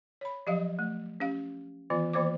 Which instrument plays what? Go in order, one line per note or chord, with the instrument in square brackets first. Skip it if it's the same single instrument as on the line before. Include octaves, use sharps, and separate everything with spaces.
[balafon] C#5 B5
F3 F#3 G4 D#5 F5
A3
C#4 G4 F5
D#3 E3 B3 F4
D#3 E3 A#3 C5 D6